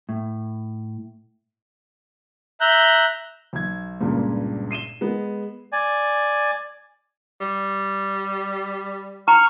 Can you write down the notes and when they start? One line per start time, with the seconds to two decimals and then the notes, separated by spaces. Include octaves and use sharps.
0.09 A2
2.61 E5 A#5 F#6 G6
3.53 B1 G#6
4.01 C#2 G2 A#2
4.71 C7 D#7 E7 G7
5.01 G#3 B3
5.72 D5 G#5
7.41 G3
9.28 A#5 C#6 F6